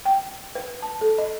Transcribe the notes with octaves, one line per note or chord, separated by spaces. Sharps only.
G5
B4
A5
A4
D#5